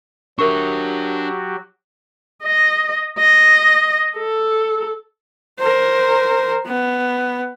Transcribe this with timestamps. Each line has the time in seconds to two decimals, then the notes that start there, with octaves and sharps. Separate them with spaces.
0.39 F#3 D4 F#4 G4 A#4 E5 C#6
2.43 D#5
3.18 D#5
4.17 A4
5.59 A#4 C5
6.66 B3